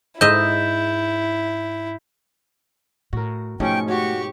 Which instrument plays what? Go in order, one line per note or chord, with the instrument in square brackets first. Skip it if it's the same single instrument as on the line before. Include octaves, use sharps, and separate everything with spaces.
[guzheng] G#2 D#5 E5 [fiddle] E4 [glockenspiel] G6 E7
[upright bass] A2 [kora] F#4 A#4
[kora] G#2 B2 F3 [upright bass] A3 [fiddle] C#4 C#6 [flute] G5
[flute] F#4 [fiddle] G4 C#6 [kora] C#5